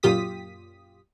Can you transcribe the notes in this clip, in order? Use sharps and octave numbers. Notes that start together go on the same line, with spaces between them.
F#2 A#2 F4 G4 D#6 B6